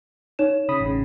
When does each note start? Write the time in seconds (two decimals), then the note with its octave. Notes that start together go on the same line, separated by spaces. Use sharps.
0.39 D#4 C#5 E7
0.69 C#3 B5 D#6
0.81 A1 C#3